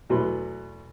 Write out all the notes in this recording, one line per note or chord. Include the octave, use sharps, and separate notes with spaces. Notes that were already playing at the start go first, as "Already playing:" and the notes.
E2 B2 F#3 A3 B4 C6